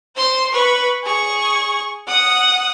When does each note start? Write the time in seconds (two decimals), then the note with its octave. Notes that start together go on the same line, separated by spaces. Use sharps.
0.16 C5 C6
0.52 B4 C#6
1.04 G#4 C#6
2.08 F#5 D#6